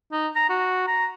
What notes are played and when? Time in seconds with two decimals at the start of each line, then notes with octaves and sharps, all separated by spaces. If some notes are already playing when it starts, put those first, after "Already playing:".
0.12 D#4
0.36 A#5
0.49 F#4
0.87 A#5